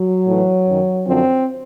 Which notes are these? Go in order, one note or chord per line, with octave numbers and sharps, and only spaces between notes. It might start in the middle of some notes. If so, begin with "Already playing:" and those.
Already playing: F#3
A2 E3
F#2 D#3
F#2 D3 F3 C4